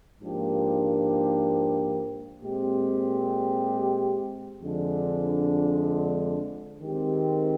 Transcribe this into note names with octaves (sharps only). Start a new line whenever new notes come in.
G#2 F3 A#3 D4 G4
A#2 G#3 C4 G4
F2 D3 F3 G#3 D4
D#3 G#3 C4 G4